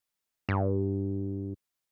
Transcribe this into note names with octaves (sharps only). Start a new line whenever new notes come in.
G2